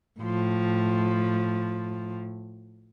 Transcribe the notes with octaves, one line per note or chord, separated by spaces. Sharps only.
A2 F3